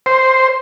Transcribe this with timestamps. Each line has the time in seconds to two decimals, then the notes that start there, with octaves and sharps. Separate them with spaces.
0.06 C5